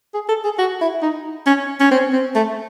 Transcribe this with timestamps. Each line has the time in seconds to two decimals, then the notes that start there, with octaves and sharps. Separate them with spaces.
0.14 G#4
0.29 A4
0.44 G#4
0.59 F#4
0.81 E4
1.02 D#4
1.47 C#4
1.80 C#4
1.91 C4
2.13 C4
2.35 A3